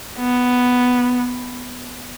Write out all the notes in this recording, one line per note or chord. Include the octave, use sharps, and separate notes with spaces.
B3